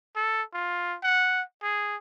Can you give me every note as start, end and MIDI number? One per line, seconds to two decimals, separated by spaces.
0.16 0.42 69
0.54 0.96 65
1.03 1.42 78
1.63 1.96 68